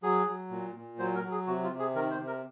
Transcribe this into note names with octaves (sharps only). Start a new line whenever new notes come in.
F#3 G#4
F#3
A#2
A#2
F#3 C5
A#4
F#3
G#4
C3 F#4
F4
C3
G#4
D#3 A#4
C5
C3
A#4